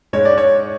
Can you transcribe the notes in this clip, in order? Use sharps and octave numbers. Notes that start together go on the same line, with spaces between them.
G#2 G#3 C#5
D5
C#5